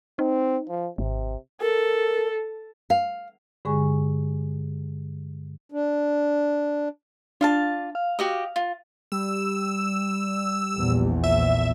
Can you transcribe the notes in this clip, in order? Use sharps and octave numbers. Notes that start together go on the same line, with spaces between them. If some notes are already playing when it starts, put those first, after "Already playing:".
C4 D#4
F3
G#1 C3
A4 A#4
F5
G2 D3 G#3 G#4 G#5 C#6
D4
D4 F4 F5 A5
F5
F#4 G4 D#5
F4
G3 E6
A#1 E2
E5